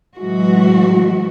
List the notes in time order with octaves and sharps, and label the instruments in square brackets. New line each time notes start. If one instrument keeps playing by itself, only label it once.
[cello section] A2 E3 F#3 G#3 F#4